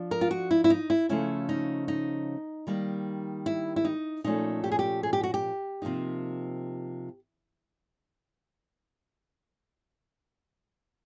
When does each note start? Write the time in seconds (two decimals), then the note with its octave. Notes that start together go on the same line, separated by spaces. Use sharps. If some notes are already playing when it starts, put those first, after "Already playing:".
Already playing: F3 D4
0.11 A#4
0.21 F4
0.31 F#4
0.51 E4
0.64 E4
0.70 D#4
0.90 E4
1.09 C#3 F3 A3 C#4 E4
1.49 D#4
1.88 D#4
2.67 D#3 G3 A#3 D#4
3.46 E4
3.76 E4
3.85 D#4
4.24 A#2 F3 A3 C#4 D#4
4.64 G4
4.72 G#4
4.79 G4
5.03 G#4
5.13 G4
5.23 F#4
5.34 G4
5.82 C3 F3 A#3 D#4